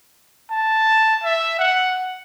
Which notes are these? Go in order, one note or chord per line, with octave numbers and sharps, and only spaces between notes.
A5
E5
F#5